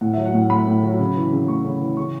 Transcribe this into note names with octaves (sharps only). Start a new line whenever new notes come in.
A2 F#5
F#3 E5
F#5
A2
A3 B5
A2
F#3
C#3
E3
C#3
A3 C#6
C#3
E3
C#3 C#6